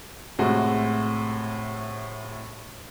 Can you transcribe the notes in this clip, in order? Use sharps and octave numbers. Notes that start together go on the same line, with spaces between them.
A2 C3 G#3 F#4